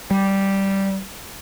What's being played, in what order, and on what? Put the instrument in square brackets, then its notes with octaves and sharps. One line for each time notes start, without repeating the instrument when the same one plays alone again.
[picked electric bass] G3